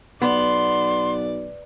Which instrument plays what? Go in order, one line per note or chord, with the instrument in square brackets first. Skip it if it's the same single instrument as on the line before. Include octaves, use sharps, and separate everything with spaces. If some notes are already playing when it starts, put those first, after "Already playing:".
[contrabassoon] B1 [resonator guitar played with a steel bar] B3 [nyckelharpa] D5 [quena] C6